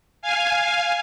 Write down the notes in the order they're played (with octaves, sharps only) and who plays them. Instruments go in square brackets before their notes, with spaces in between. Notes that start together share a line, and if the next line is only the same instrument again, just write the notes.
[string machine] F5 G#5